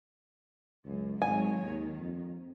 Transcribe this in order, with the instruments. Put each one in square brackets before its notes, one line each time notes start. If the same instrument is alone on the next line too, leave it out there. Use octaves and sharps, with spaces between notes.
[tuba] C#2 [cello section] F#2
[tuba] G#1 [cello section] F#3 G#3 C#5 [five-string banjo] G#5
[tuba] D#2 [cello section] D#3
[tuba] F2